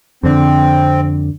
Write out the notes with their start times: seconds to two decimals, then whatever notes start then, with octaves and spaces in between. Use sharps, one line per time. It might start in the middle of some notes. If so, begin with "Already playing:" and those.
0.23 F2 D3 C4